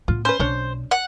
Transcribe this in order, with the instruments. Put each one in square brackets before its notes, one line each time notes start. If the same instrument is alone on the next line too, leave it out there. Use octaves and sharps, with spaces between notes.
[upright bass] A2 B3 [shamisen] F4
[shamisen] C#4 B4 [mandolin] C5
[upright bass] B1 [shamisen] C#4 D4 C#5
[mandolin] F#5